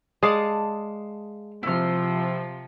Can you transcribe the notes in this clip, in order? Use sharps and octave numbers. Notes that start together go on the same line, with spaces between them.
G#3 D5 F5 A5 D#6
C3 F3 E4 F6